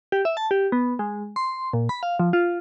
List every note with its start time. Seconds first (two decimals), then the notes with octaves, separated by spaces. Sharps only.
0.12 G4
0.25 E5
0.37 A5
0.51 G4
0.72 B3
0.99 G#3
1.36 C6
1.73 A#2
1.89 B5
2.03 F5
2.20 F3
2.33 F4